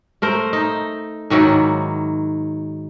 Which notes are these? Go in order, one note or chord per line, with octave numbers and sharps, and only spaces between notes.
A3 A#4 C5
D#4
G#2 D#3 F#3 E4